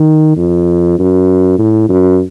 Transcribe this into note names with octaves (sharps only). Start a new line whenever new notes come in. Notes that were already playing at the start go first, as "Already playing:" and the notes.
Already playing: D#3
F2
F#2
A2
F#2